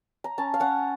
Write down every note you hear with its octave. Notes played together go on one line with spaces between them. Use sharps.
A#5
C#4 A5
F5
C#4 F#5